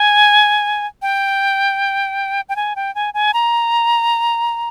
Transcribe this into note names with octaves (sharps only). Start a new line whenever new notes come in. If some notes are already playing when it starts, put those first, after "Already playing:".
Already playing: G#5
G5
G5
G#5
G5
G#5
G#5
A#5